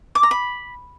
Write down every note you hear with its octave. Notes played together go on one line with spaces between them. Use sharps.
D6
A#5
B5